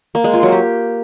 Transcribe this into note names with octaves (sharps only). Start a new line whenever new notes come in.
A#3
G#3
F4
F#3
G4